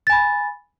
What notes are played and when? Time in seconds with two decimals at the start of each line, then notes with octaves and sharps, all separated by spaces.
0.07 A6
0.10 G#5
0.13 B5